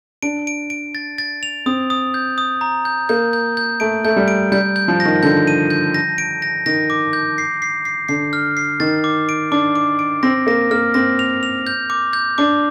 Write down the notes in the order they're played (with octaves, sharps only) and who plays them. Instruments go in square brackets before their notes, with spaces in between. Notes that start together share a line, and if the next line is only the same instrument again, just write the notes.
[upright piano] D4 [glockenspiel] D7
[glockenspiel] D7
D7
A6
A6
F7
[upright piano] C4 [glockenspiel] D#6
[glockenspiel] D#6
G6
D#6
A#5
G6
[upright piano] A#3 [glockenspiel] G6
[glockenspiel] G6
G6
[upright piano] A3 [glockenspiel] D7
[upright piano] A3 [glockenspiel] G6
[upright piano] G3
[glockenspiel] D7
[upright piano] G3 [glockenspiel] G6
[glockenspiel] G6
[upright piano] F3
[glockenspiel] A#6
[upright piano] D#3
[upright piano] D3 [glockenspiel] G6
[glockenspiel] D#7
G6
A#6
D7
A#6
[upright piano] D#3 [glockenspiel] A#6
[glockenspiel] D6
G6
C7
C7
C7
[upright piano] D3 [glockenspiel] C7
[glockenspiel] F6
C7
[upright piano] D#3 [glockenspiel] A6
[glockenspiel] D6
D7
[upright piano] D4 [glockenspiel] D6
[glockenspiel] D6
D7
[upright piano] C4 [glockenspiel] A#6
[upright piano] A#3 [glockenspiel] A#6
[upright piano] A#3 [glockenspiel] F6
[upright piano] C4 [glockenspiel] A#6
[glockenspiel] F7
F7
G6
D6
G6
[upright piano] D4 [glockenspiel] D6